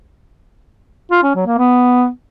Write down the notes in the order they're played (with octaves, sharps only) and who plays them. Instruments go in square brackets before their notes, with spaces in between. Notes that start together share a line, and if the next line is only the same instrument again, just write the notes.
[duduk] F4
C#4
F#3
A#3
B3